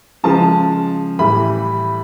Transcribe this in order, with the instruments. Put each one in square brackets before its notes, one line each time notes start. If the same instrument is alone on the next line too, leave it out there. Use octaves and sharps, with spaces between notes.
[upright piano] C#3 F3 G#3 A5
A2 E3 G3 B5